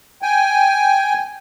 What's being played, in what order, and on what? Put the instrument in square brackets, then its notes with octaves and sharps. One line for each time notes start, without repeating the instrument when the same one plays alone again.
[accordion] G5 G#5